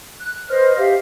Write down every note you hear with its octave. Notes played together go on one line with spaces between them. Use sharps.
F#6
B4 C5 D#5 F6
G4 C5 E5 F5